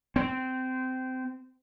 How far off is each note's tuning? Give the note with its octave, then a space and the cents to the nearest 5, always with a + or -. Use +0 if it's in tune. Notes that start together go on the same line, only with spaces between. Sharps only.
C4 -20